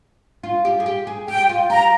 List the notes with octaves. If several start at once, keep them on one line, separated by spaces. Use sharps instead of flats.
F4
G4
G#4
G4
G#4
G4 G5
F4
G4 A#5